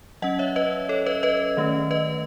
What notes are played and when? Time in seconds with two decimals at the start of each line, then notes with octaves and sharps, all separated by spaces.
0.22 F#3 C#4 D#5 F#5
0.39 C#5 E5
0.56 B4 D#5
0.89 A4 C#5
1.06 B4 D#5
1.23 B4 D#5
1.57 D#3 A3 C#4
1.91 B4 D#5